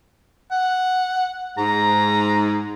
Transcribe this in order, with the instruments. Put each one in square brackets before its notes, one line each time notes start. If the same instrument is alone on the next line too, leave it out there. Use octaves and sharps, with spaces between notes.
[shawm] F#5
[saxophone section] G#2 [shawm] A#5